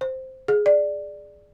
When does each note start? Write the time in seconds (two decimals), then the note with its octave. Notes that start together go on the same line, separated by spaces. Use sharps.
0.01 C5
0.48 G#4
0.66 D5